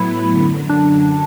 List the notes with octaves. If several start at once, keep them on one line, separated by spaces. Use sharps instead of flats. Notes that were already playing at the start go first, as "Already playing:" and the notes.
Already playing: A2 F#3 B3 E4
F#2 D3 F#3
D4